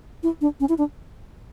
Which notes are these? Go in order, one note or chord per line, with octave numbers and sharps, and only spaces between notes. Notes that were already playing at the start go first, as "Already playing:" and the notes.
E4
D4
C#4
E4
D4